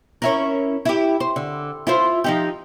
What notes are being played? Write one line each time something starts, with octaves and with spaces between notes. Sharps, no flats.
C#4 E4 A#4
E4 G4
C5
D3
E4 F4 C5
F3 D#4 G4